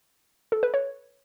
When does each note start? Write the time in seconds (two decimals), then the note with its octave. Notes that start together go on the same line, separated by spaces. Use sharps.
0.52 A4
0.63 B4
0.74 C#5